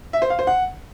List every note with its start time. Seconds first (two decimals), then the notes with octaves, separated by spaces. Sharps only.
0.13 E5
0.22 C5
0.30 F5
0.39 C5
0.47 F#5